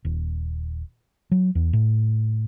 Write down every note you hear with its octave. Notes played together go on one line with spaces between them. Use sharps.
D#1
F#3
E2
A2